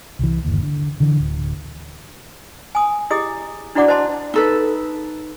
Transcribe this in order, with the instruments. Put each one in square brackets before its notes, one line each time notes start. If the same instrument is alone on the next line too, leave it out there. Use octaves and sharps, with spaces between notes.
[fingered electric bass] C2 E3
G1 D#2
D3
D3 E3
D1
[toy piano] G#5 D#6
E4 G4 G#4 D#5 D#6
D4 E4 F#4 D5 F#5 D6
C5 D#5 A5 C6
[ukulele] D#4 A4 B4